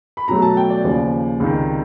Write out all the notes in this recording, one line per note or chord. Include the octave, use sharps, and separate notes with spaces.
B5
B2 F#3 A3 A#5
A5
G5
D5
D#2 C#3 F3 D5
C#2 C3 D#3